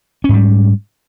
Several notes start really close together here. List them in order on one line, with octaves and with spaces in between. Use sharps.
C#4 G#2 G3